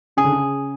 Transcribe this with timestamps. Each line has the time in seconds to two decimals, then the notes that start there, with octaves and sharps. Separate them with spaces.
0.17 C#3 G#4
0.25 D3
0.32 C#3